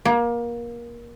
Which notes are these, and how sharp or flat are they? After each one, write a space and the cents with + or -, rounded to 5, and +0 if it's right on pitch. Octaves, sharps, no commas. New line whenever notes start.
A#3 +25